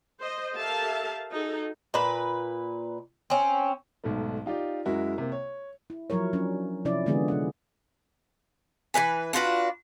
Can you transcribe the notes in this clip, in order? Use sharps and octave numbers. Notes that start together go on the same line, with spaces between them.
C5 D#5
G4 A4 A#4 E5 F5 A5
D#4 F#4 G#4 A4
A#2 B4
C4 C#4
B1 G#2 A3
D#4 F4 G4 D5
F#2 G#3 E4 F#4 A#4
C3 A#3
C#5
E4
F3 F#3 E4 A#4 C#5
F#3 C#4 D4
C3 F3 C#4 E4 D5
D3 E3 G#3 B3 F4 G#4
C3 F#5
E3 A#3 B4 G#5
D4 F4 F#4 B4